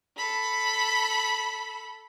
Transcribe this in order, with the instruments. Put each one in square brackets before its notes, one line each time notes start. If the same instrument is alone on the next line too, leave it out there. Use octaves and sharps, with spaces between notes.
[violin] A4 B5